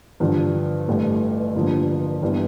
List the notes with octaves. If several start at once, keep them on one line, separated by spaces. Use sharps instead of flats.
G2 D3 F3
A1 G2 E3 A3
A1 G2 D3 F3 A#3
G1 G2 E3 G3